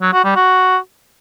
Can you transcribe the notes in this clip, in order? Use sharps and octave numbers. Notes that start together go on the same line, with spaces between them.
F#3
F#4
G3
F#4